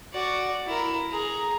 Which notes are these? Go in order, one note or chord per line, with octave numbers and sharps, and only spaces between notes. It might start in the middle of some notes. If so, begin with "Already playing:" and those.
F#4 D5
E4 A#4
G#4 A#5